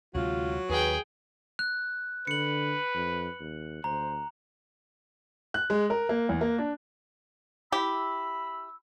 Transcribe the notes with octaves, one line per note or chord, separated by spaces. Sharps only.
D2 C3 F#3 G#3 F4
D#2 G#4 B4 G5
F#6
D3 B4 C#7 F#7
F2
D#2
D2 C5 A#5
F#6
G#3
A#4
A#3
E2
A#3
D4
E4 G4 B5 E6